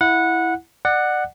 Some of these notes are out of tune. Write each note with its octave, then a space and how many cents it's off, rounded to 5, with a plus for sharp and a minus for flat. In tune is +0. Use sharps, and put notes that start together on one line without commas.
E4 +0 F#5 -15
D5 +30 F#5 +0